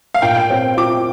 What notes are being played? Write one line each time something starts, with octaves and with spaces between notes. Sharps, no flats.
F5
A#2 G5
C4
F4 D6